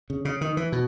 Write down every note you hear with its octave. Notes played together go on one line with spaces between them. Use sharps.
C#3
C#3
D#3
E3
B2